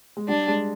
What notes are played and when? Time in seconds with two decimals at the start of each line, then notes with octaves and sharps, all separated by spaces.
0.17 G#3
0.28 G3 D4
0.48 G#3